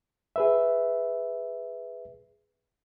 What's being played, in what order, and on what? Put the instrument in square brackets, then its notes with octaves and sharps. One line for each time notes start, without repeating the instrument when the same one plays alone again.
[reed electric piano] G#4 B4 E5